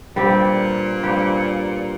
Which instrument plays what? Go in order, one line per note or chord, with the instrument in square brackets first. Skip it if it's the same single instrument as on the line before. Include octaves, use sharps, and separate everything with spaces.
[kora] G2 G3 C4 G4 [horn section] A#2
[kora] G2 G3 C4 G4